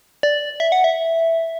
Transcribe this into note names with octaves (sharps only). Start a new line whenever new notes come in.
D5
E5
F#5
E5